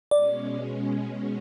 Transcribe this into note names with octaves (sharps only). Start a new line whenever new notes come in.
B2 G#3 C#4 D5